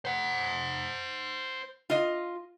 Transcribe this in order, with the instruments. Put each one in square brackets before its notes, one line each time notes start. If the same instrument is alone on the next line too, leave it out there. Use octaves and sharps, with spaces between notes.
[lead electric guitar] C5 F#5
[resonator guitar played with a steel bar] F4 D#5